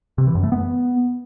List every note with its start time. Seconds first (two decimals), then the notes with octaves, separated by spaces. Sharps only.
0.18 C3
0.27 E3
0.35 F#2
0.43 A3
0.52 B3